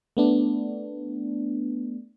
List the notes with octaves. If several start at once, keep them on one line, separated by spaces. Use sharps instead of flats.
A3 B3 D4